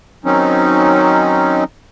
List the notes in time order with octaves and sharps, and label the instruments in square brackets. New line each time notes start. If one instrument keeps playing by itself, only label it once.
[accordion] D#3 F#3 C4 C#4 D#4